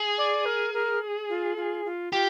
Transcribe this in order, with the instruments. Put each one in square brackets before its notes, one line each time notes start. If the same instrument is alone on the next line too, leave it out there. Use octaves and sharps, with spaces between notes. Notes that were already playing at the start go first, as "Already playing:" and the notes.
Already playing: [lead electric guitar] G#4
[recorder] D5
A#4
A#4
F4
F4
F4
[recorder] F4 [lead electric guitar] G4